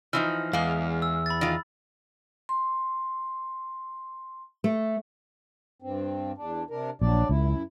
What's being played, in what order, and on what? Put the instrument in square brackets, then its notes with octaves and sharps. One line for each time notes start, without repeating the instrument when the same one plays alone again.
[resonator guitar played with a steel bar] E3 F3 D#4 [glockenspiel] F6
[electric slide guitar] E2 [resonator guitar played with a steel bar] G#3 F5
[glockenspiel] E6
B5 A6
[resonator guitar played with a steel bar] D#3 F4
[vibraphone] C6
[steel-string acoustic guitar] A3
[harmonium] G2 C4
E2 D4
C3 D4 A#4
[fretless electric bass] A#1 [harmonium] F#3 D4 D5
[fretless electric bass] C#2 [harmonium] F#2 E4